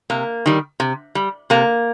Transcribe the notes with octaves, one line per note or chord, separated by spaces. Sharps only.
C3 A#3
D#3 G3
C3
G3
C3 A#3